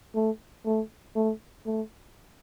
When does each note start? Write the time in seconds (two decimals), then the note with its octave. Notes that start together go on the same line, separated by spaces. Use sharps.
0.15 A3
0.66 A3
1.16 A3
1.66 A3